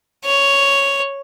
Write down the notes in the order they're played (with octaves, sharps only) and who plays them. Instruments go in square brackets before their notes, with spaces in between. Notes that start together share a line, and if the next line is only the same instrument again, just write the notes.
[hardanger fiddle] C#5